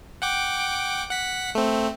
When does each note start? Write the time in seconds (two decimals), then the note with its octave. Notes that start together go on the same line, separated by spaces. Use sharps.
0.22 F#5 G5 D6
1.10 F#5 B6
1.55 A3 C4